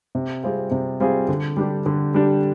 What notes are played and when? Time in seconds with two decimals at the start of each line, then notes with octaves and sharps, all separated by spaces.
0.15 C3
0.43 G3 C4 F4 G#4
0.71 C3
1.00 G3 C4 F4 G#4
1.29 D3
1.57 G3 D4 G4
1.86 D3
2.14 G3 D4 G4